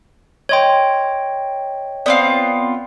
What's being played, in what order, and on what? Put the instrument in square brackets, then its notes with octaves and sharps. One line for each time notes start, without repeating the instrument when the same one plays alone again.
[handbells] C#5 D#5 G5 [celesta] C6 G#6
[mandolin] B3 C4 F4 [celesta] D5